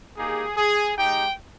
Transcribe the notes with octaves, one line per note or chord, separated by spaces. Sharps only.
A#3 D#4 G4 G#4
G#4
G#3 D#4 G4 G5